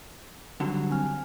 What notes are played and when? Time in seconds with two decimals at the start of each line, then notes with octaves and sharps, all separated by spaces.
0.60 G2 D3 F#3 F#4
0.91 C4 G#5 F6